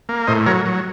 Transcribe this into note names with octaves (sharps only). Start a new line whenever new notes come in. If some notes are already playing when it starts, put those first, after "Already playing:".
A#3
A2 C5 D#5
F#3 A#4 C#5
F#3